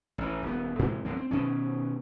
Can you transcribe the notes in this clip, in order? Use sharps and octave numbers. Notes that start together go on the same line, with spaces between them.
A1 E3
D#1 B3
A2 C3 E3 G#3
D2 A2 F#3 C4
C4
B2 D#3 C#4